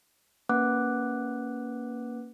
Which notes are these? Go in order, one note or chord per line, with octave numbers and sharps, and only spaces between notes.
A#3 C#4 B4 F#5 D6 F#6